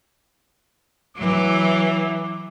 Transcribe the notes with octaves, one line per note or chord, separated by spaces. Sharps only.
E3 F#3 D6